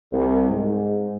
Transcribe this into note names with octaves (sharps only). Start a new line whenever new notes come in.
C2
G#2